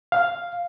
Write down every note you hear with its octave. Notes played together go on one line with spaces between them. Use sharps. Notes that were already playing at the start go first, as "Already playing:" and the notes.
F5